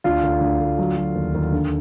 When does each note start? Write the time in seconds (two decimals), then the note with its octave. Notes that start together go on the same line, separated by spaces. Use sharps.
0.04 D2 D4 F4
0.23 D2
0.41 D2
0.59 D2
0.78 F#3
0.96 F#3
1.15 D#2
1.34 D#2
1.52 D3